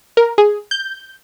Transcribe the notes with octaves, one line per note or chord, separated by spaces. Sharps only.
A#4
G#4
G6